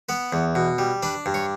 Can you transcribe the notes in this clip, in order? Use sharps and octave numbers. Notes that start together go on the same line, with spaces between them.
B3 B4
E2
B2
G3
D4 B4
G2
C#5